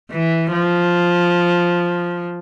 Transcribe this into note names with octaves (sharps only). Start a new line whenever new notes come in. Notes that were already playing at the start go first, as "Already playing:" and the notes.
E3
F3